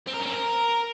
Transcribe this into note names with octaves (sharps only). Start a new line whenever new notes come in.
C4
A#4
C#4
C4
A#4